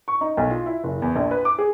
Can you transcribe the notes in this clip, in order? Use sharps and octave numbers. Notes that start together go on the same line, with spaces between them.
C#6
D#4
B1
F4
E4
F#1
E2
A#1
B4
D6
G#4